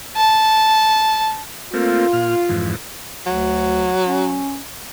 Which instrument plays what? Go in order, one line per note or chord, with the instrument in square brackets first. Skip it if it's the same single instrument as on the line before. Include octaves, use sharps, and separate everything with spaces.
[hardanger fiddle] A5
[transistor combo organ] A3 A#3 C4 [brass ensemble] F4
[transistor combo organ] A#2 F6
F2 G#2 E3
[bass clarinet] D2 [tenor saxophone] F#3
[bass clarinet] C#4